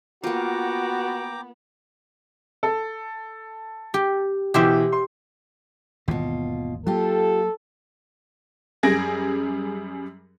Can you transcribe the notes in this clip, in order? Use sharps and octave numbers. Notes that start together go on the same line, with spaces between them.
A#3 B3 F4 F#4 G5 A#5 D6
A4
G4
B2 E3 G4 C5 E5
C6
G#1 D#2 B2 E3 F4
F#3 A#3 F4 G4 A4
F#2 G3 G#4 G#6 A#6 D7